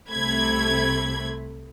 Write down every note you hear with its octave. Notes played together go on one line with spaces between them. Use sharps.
C2 C3 A3 C4 B5 G#6